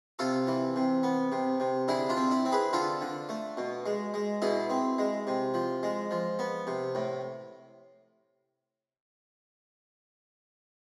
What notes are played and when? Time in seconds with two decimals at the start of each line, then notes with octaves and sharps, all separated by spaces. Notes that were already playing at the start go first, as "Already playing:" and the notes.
0.19 C3 F4 A4
0.47 E3
0.76 C3
1.03 B3
1.32 C3
1.60 C3
1.88 D3 E4 G#4
2.09 D4 F4
2.16 C4
2.31 E4
2.45 C4
2.52 G#4 B4
2.73 D3 F4 A4
3.01 D3
3.29 A3
3.57 B2
3.86 G#3
4.14 G#3
4.42 B2 E4 G#4
4.70 C4
4.98 G#3
5.27 C3
5.54 F3
5.83 G#3
6.11 F3
6.39 B3
6.67 C3
6.95 A2